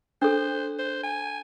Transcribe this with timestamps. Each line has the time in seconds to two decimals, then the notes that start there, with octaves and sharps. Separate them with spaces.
0.22 D4 A4 C5
0.79 C5
1.03 G#5